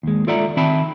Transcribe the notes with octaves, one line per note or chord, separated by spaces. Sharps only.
D#2 G#3
F4 A4 D5 E5 F#5 A#5
D#3 C4 E5 G5 A5 B5